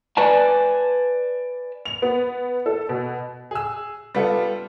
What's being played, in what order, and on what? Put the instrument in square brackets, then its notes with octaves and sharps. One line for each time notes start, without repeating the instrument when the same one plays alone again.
[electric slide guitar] B4 D5 G#5 A5
[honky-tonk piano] F7
B3
A4
B2
[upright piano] G#4 E6
G3 B3 F4 A4